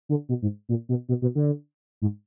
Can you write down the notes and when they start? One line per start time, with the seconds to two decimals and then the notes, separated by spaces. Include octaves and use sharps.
0.09 D3
0.29 B2
0.42 G#2
0.69 A#2
0.89 B2
1.09 B2
1.22 B2
1.35 D3
2.02 G#2